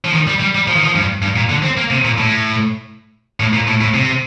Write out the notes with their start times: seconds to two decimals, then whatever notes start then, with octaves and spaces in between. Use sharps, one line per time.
0.05 F3
0.13 D#3
0.27 G3
0.41 G3
0.55 G3
0.68 F3
0.76 D#3
0.84 F3
0.95 G2
1.22 G2
1.36 A#2
1.49 D3
1.63 C4
1.77 A#3
1.90 C3
2.04 A#2
2.18 A2
3.40 A2
3.53 A#2
3.67 A2
3.81 A2
3.94 C3